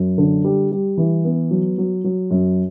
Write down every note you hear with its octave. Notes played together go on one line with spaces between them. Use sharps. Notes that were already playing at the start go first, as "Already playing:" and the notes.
Already playing: F#2
D3
G3
G3
E3
B3
F#3
F#3
F#3
F#2